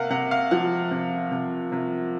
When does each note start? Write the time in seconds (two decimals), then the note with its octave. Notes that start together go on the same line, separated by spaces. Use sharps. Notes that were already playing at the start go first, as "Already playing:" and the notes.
Already playing: C3 A#3 F5 F#5
0.10 C3 F#5
0.31 F5
0.51 F3 F#5
0.91 C3
1.31 C3
1.72 C3